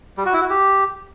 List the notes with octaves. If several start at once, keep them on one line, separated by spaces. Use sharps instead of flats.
G3
F#4
E4
F#4
G4